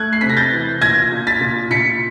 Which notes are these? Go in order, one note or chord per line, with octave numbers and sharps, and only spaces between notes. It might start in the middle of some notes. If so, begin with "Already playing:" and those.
Already playing: A3 F#6 G#6
C7
C3 B6
A#6
G6 A6
E3
A#2 G#6 A#6
A#2
A6 B6
A#2
A#2 B6 C#7